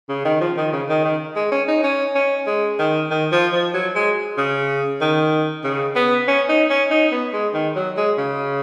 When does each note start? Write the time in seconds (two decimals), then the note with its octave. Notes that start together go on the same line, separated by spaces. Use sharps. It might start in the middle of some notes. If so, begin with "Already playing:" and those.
0.09 C#3
0.25 D#3
0.41 F3
0.57 D#3
0.73 C#3
0.89 D#3
1.04 D#3
1.36 G#3
1.52 C#4
1.68 D#4
1.84 C#4
2.15 C#4
2.47 G#3
2.79 D#3
3.10 D#3
3.32 F3
3.53 F3
3.74 F#3
3.95 G#3
4.37 C#3
5.01 D#3
5.64 C#3
5.96 B3
6.28 C#4
6.49 D#4
6.70 C#4
6.91 D#4
7.12 B3
7.33 G#3
7.54 D#3
7.76 F#3
7.97 G#3
8.18 C#3